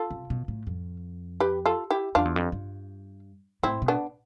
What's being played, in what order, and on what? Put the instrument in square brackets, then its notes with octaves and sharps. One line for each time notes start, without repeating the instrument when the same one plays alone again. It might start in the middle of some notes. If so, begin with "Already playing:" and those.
Already playing: [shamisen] F4 A4
[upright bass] C3
B2
A2
F2
[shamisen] G4 B4
F4 A4
E4 G4
[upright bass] F2 [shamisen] D4 F4
[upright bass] E2
F2
G2
[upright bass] A2 [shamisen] C4 E4
[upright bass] B2
[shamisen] B3 D4